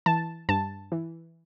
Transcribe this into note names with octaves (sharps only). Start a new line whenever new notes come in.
E3 A5
G2 A5
E3